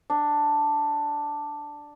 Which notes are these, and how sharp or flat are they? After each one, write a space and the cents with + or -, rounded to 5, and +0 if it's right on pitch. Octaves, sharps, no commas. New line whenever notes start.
D4 +5